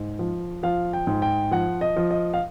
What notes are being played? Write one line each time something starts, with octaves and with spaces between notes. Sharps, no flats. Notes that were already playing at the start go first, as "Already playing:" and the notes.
Already playing: G#2
F3
F3 F5
G5
G#2
G5
F3 F#5
D#5
F3
D#5
F5